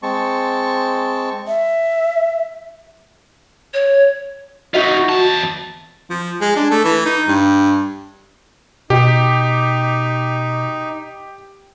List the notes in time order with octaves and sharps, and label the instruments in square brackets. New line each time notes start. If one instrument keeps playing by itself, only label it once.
[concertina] G#3 C4 A5 C#6
[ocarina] E5
[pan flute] C#5
[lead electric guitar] D#4 F4 [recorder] F#4 [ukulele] D#5 E5 F#5
[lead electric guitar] E2 A5
[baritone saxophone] F3
G#3
D4
A3
E3
D#4
G2
[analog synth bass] B2 [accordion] D#4 [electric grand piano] G4